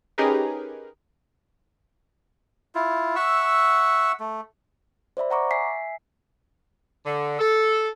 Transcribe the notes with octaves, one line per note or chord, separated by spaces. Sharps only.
C#4 D#4 G4 G#4 A#4 B4
E4 F4
E5 F#5 C#6 E6
A3
C5 D5 E5 B5
F#5 A#5 C#6 D6
E5 G#5 B6 C7
D3
A4